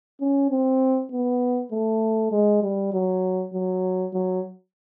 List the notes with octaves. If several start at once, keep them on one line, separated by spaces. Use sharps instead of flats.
C#4
C4
B3
A3
G#3
G3
F#3
F#3
F#3